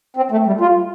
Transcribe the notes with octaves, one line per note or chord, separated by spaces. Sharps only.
C4
A3
G3
F4